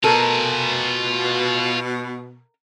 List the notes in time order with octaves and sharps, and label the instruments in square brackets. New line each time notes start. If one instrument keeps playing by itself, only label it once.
[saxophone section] B2 [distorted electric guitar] F4 G#5 [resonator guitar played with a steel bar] A4 A#4